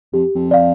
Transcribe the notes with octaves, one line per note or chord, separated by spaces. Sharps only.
F2 G4
F2
D5 F5